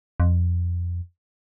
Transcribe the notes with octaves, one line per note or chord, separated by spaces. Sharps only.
F2